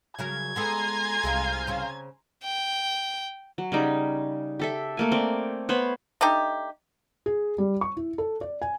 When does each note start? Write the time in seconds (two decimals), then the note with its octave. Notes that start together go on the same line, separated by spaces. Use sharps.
0.19 C#3 F#3 A#4 G#6
0.56 G#3 B3 A4 G#5 A#5 C6
1.23 C2 G#3 C4 D#4 F5
1.67 C#3 C4 C#4
2.43 G5
3.58 F#3
3.72 C#3 G3 D#4
4.59 G4 A4 E5
4.97 A3 A#3 G#5
5.12 C4 D5
5.69 B3 C5 C#5 B5
6.21 A3 D4 D#4 G4
7.26 G#4
7.58 G3
7.81 C#6
7.97 E4
8.18 A4
8.41 D5
8.62 G#5